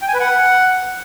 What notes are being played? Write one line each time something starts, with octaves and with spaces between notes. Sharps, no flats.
G5
G#5
B4
F#5